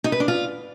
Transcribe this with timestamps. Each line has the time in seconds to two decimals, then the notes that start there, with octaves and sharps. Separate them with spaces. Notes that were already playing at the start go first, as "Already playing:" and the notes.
0.04 D#4
0.12 B4
0.20 D4
0.28 F4